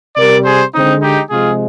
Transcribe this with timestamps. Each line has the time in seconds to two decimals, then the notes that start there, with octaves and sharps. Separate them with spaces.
0.16 C3 G3 A#4 D5
0.44 G#4 C5
0.74 D3 G#3 C4 D#4
1.01 D#4 G4
1.30 C3 F3 G#3 F4 G#4